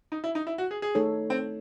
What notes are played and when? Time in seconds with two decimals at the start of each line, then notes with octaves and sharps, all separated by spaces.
0.12 D#4
0.24 E4
0.35 D#4
0.47 E4
0.58 F#4
0.71 G#4
0.82 G#4
0.95 A3 D#4 A4 C#5
1.30 C4